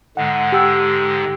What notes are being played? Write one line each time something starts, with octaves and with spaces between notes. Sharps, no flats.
G#2 D3 G#3 F#5
G4 G5 E6